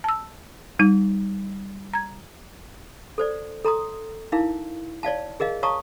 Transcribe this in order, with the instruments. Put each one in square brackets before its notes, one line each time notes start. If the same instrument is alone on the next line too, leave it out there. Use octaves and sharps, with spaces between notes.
[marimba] A5 E6
G3 D#4
A#5 G#6
[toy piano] A4 C5 D5
A4 A#5 C6 D#6
D#4 E4 A#4 F5
C#5 D5 F5 A5
G#4 A#4 D#5 F5
C#5 F5 A5 A#5 C#6 D#6